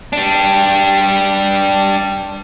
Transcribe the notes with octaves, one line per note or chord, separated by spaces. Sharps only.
G3 D4